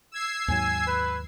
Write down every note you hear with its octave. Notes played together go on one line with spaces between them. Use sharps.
E6 G#6 C7
D#2 G#2 F#3 G#5
B4